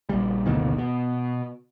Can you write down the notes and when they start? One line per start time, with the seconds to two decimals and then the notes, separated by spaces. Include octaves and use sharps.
0.09 A#1 G3
0.46 F#1 D2 B2 D#3
0.78 B2